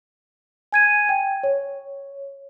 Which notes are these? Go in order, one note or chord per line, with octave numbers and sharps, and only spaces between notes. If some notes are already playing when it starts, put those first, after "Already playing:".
G#5 G#6 D#7
G5
C#5